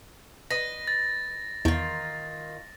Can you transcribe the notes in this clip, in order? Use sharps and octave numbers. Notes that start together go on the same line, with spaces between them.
B4 D#5 A#6
A6
E2 D#3 F4